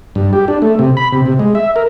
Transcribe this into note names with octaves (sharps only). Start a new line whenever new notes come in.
G2
G4
D4
A3
C3
B5
C3
C3
G#3
E5
A#4